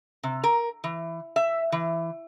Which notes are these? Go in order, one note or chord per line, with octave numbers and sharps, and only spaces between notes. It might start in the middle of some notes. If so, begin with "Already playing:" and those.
C3
A#4
E3
E5
E3